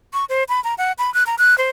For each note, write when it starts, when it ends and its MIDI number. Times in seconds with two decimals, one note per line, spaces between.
0.13 0.25 85
0.29 0.44 72
0.49 0.63 83
0.64 0.75 82
0.78 0.92 78
0.98 1.13 83
1.14 1.24 90
1.27 1.35 82
1.39 1.57 90
1.58 1.70 72